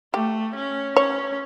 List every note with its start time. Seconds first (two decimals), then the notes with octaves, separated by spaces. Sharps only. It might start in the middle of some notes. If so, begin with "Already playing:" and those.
0.13 A3 G4
0.55 C#4
0.96 C#4 C#5